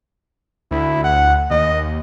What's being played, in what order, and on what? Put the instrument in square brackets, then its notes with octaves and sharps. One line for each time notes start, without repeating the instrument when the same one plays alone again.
[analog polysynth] D2 [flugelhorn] E4
[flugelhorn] F#5
[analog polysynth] D#2 [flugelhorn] D#5